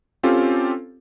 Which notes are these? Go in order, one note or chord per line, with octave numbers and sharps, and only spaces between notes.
C4 C#4 F4 G4 A4